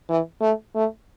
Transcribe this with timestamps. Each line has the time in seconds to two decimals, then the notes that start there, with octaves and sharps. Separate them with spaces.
0.09 E3
0.42 A3
0.75 A3